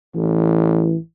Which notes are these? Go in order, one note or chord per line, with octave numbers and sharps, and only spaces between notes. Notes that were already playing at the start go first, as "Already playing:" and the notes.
A1 E3